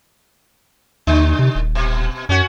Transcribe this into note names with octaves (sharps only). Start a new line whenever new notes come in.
D#2 D3
C3
D#1
B2
F#2 C#4 F#4